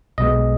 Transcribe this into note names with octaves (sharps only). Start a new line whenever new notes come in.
B1 B2 G#3 D#5